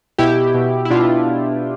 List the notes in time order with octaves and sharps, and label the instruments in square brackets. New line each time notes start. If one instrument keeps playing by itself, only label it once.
[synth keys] B2 E4 G4
B2
E4
B2 D4 F4
B2